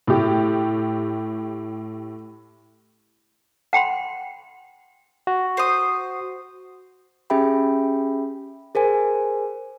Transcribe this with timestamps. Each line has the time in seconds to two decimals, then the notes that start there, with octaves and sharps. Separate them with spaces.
0.07 A2 G4
3.73 F#5 G5 B5 C6
5.27 F#4
5.57 C5 D#6
7.30 C#4 G4 G#4 E5 G5 B5
8.75 G#4 A#4 C5 G#5